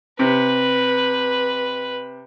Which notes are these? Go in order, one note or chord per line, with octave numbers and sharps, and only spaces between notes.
C3 B4